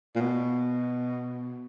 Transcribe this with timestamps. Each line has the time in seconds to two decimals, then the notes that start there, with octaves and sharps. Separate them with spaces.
0.16 A#2
0.21 B2